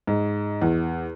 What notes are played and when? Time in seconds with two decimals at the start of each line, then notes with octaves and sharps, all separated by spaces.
0.07 G#2
0.62 E2